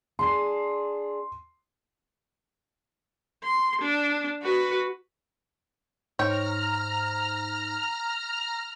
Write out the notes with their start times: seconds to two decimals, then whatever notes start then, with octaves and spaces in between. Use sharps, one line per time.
0.19 D4 G#4 C6 C7
3.44 C6
3.81 D4
4.42 F#4 B4
6.19 G#2 D#4 C5 C#5 G5 A#5 F6